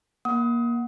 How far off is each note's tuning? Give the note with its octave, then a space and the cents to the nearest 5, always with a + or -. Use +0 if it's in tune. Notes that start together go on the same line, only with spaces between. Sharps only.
A#3 +25 F#5 +0 D#6 +30